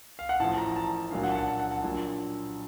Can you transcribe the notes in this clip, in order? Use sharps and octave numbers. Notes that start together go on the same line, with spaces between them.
F5
F#5
A1 A2 F3 A5
A#5
A5
A#1 A#2 F#3 F5
F#5
A5
F#5
A5
F#5
A5
A#1 A#2 F#3